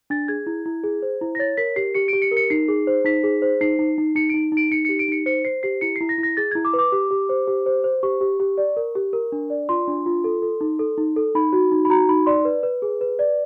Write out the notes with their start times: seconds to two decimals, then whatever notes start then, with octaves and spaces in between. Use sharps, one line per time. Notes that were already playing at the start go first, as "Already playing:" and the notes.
0.10 D4 A6
0.28 G#4 G#6
0.47 E4
0.66 E4
0.84 G#4
1.02 C5
1.21 E4
1.35 A#6
1.39 C#5 A6
1.57 A#4 B6
1.76 G4 C7
1.95 G4 C#7
2.08 G4 D7
2.22 C#7
2.31 A#4
2.37 C#7
2.50 D#4 C7
2.68 G#4
2.87 C5
3.05 D#4 B6
3.23 G#4
3.42 C5
3.61 D#4 C7
3.79 D#4
3.98 D#4
4.15 D#4 C#7
4.30 D#4 D7
4.52 D#4 D7
4.71 D#4 C#7
4.85 G4 C#7
4.99 D7
5.08 D#4 C#7
5.26 C5 C#7
5.44 C5 C7
5.63 G4 C7
5.81 E4 C#7
5.96 E4 C7
6.09 A#6
6.18 E4
6.23 A#6
6.37 G#4 A6
6.51 E4 G#6
6.65 D6
6.74 B4
6.79 D6
6.92 G4
7.11 G4
7.29 C5
7.48 G4
7.66 C5
7.84 C5
8.03 G4 C#6
8.21 G4
8.40 G4
8.58 D5
8.77 A#4
8.95 G4
9.13 A#4
9.32 D4
9.50 D5
9.69 F4 C6
9.87 D4
10.06 F4
10.24 A4
10.42 A4
10.61 D#4
10.79 A4
10.98 D#4
11.16 A4
11.35 D#4 B5
11.53 F#4
11.72 D#4
11.85 B5
11.90 F#4 A#5
12.09 D#4 B5
12.26 D5 C6
12.45 B4
12.63 B4
12.82 G#4
13.01 B4
13.19 D5